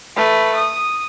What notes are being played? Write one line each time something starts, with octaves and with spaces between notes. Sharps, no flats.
A3 B4
D#6